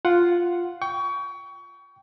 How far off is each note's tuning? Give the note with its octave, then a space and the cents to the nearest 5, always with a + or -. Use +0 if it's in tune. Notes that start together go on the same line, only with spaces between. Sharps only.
F4 +0 F#5 +0
G5 -5 C#6 +25